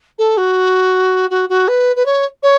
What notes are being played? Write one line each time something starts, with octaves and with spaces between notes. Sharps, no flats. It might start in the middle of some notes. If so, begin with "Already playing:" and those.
A4
F#4
F#4
F#4
B4
B4
C#5
C#5